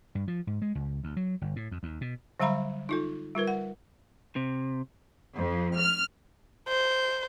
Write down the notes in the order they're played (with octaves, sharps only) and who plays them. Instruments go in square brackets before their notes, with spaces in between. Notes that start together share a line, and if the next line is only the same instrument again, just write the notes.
[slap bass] G2
F3
G#2
G#3
C#2
D2
F#3
G1
A2
F2
D#2
B2
[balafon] D3 F#3 G3 F5 A#5 B5
D#4 F4 A4
G3 F4 A#4 B4
F#5
[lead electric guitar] C3
[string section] F2
F6
[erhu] C5